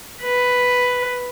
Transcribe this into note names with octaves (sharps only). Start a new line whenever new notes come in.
B4